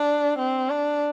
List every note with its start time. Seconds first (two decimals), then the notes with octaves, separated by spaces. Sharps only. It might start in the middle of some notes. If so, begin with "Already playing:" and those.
Already playing: D4
0.38 C4
0.70 D4